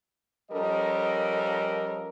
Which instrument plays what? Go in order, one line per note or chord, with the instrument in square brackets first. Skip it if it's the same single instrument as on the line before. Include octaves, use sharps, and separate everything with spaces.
[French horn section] F3 G3 C#4 A4 A#4 D#5